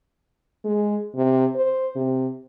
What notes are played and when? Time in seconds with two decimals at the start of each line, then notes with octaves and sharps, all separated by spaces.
0.65 G#3
1.16 C3
1.55 C5
1.96 C3